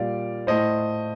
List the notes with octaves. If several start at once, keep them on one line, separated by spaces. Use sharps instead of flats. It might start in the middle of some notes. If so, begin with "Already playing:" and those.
Already playing: A#2 G3 D5 F5
A2 A3 C5 D#5